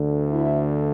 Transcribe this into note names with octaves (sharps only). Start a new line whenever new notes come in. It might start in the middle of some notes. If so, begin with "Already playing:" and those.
Already playing: D2 D3
E4